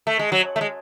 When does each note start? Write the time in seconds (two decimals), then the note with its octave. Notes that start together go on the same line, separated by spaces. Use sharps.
0.07 A3
0.19 G#3
0.32 F#3
0.56 A3
0.61 G#3